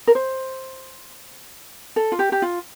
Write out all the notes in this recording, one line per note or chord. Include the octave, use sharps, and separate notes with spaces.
A#4
C5
A4
F4
G4
G4
F4